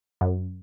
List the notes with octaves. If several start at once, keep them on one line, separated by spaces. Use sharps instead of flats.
F#2